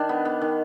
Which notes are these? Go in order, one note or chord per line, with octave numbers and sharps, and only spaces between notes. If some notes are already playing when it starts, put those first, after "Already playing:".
Already playing: D#3 D4
B3
B3
D#3